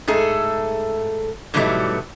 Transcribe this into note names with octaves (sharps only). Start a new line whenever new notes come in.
G#2 A3 G#4 A4
G#2 B2 E3 F#3 G3 A3